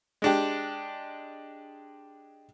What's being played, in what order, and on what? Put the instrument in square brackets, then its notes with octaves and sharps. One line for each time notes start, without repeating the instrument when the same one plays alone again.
[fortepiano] G#3 D4 G4